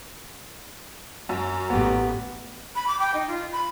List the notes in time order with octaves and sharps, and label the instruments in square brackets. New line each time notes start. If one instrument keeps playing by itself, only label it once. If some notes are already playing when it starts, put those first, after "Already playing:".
[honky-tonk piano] F#2
[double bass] A1 [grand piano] B3 G4
[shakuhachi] B5
D6
G5
D#4
F4
B5